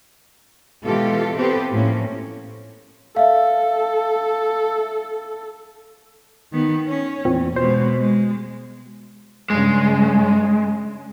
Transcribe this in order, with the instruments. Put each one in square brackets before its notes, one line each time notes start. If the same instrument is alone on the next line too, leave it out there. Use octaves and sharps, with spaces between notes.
[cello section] B2 E3 G#3 F4 G4 A4
B3 C4 G4 A4 B4 C5
A2 F3 A#3 C4 C#4
[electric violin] A4 [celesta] E5 F5
[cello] D#3 B3
C#4
[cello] E2 [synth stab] A#2 C4
[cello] B2 G#3 [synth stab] C5
[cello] G#3
[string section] G2 C#3 [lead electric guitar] G#3